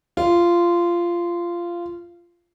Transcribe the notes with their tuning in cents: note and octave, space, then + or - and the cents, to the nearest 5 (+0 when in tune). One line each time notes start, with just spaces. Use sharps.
F4 -15